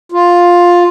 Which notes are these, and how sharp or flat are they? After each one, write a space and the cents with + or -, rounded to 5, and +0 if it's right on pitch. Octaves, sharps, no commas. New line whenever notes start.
F4 +10